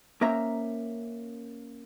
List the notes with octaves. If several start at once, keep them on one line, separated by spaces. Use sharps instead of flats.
A#3 C#4 A#4 C5 E5 A#5